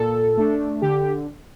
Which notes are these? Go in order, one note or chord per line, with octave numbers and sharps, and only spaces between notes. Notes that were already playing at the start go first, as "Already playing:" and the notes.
Already playing: A#2 A4
A3 D4
D3 G4